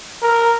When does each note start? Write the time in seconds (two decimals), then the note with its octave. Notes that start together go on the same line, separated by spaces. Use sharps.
0.22 A#4